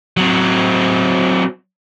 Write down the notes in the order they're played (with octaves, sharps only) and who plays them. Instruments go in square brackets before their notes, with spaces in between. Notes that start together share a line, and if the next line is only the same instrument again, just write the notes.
[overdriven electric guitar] F#3 C4